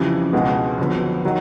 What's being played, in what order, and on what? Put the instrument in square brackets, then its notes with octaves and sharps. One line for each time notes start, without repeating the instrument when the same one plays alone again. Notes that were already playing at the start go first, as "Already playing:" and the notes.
Already playing: [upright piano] F2 C#3 E3 G3
C#2 B2 G#3 B3
F2 D3 F#3 B3
D#3 F#3